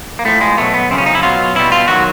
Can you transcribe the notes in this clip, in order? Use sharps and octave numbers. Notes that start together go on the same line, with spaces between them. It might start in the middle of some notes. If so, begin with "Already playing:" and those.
A#3
A2 F3 A3
G#3
B2 F#3 A3
B3
F#2 C#3 F3 C4
C#4
D#4
E4
B2 F#3 F4
B2 G3 E4
F4
D#3 F#3 F#4